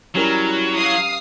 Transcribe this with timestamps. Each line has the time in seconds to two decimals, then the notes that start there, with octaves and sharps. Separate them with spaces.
0.15 F#3 G3 C#4 E4 A#4
0.77 F5 D#6 C7